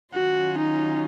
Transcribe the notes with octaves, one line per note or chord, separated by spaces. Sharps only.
D#3 F#3 C#4 F4 F#4
D#4